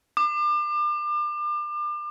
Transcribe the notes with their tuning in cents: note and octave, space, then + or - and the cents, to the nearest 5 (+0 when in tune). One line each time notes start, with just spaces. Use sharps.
D6 +35